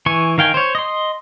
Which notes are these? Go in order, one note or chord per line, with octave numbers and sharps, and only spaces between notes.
E3 G#5 C#6
D#3 F5 G5 G#5
C5 C#5
D#5 C6